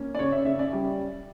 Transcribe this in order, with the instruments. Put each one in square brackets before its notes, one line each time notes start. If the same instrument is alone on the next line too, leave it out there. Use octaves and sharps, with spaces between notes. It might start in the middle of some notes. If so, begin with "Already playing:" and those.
Already playing: [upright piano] A#3 C#4
D5
C#3 C#5
E5
C#3 E5
D5
G3